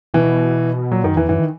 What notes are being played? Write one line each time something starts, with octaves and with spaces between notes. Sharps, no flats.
B2 E3
A#2 F#3
F#2 D#3
E2 E3
F#2 E3
D#3